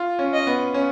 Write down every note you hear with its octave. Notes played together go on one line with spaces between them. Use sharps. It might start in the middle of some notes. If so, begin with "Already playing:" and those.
Already playing: F4
C#4
D#5
B3
C#4